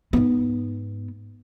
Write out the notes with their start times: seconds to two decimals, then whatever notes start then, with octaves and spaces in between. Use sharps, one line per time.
0.13 G#2 B3